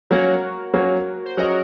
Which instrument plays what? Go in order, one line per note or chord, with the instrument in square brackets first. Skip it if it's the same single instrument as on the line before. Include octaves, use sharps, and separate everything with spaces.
[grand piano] F#3 A#3 C#4 [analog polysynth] F#4 A#4
[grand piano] F#3 A#3 C#4
[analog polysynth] C5
[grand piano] F#3 C#4 G#4 D#5 [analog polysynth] F#4 A#4